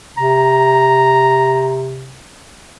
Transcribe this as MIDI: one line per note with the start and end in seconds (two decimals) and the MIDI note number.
0.17 2.22 48
0.17 1.87 82